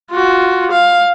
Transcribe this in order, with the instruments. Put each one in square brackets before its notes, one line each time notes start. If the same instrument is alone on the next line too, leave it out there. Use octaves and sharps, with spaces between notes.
[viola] F4 F#4
F5